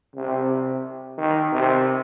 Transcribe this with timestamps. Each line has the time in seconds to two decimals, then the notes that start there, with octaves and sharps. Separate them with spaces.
0.16 C3
1.18 D#3
1.52 C3